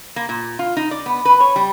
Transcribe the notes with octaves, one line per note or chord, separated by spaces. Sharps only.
A#3
A#2
F4
D#4
D5
B3
B4
C#5
G3